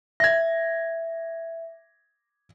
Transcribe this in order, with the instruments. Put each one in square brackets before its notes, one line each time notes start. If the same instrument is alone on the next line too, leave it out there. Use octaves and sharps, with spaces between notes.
[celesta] E5 [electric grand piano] G#6 A#6